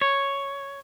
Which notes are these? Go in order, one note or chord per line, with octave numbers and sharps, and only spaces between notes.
C#5